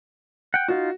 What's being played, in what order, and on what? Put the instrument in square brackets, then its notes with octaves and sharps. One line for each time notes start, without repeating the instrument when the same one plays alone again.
[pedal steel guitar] F#5 G5
[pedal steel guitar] D#4 F4 [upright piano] F#4